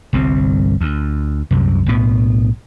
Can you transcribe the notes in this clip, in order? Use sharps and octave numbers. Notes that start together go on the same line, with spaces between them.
G1 C2 G2 C4
D2
C2 F#2 C3
B1 A2 B3